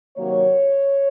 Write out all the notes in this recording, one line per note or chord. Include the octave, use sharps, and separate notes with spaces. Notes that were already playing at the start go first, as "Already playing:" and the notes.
C3 D#3 F#3 A#3 C#5